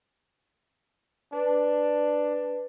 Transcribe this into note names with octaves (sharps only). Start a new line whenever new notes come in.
D4 B4